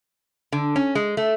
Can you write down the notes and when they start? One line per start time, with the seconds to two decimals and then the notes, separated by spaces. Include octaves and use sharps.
0.52 D3
0.76 C#4
0.95 G#3
1.17 A3